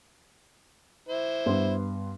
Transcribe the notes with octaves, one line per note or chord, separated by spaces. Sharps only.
E4 C5
G2 B3 C6